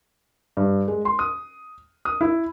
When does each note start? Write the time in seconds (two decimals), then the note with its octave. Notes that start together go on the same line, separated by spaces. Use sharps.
0.57 G2
0.88 G#3
1.05 C6
1.19 D#6
2.05 D#6
2.21 E4